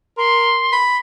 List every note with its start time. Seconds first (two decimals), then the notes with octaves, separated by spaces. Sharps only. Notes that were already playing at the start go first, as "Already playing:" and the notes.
0.17 A#4 C6
0.73 B5